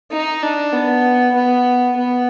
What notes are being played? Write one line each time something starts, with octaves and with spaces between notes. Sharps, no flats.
D#4
D4
B3
B3
B3